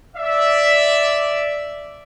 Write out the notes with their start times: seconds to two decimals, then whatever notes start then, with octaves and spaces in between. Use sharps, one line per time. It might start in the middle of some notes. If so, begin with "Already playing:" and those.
0.16 D5 E5